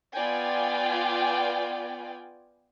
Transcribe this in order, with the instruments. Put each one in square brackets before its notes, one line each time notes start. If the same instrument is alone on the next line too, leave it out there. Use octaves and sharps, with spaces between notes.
[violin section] B3 F4 D5 G5 G#5